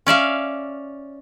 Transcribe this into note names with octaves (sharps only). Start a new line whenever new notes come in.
C#4 D5 E5 F5